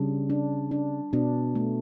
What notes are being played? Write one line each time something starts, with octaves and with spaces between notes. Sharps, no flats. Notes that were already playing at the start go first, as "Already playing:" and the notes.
Already playing: C#3 G3 D4
D4
D4
B2 D4
A3